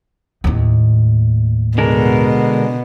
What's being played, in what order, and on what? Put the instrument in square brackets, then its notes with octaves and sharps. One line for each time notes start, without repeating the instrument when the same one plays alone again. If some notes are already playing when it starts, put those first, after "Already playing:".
[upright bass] D#2 A2
[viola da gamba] B2 [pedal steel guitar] D3 G#3 A#4